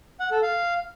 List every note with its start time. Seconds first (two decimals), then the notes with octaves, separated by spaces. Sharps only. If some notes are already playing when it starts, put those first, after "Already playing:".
0.20 F#5
0.31 A4
0.42 F5